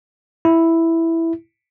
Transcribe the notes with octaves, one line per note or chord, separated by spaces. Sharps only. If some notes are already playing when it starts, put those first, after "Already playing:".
E4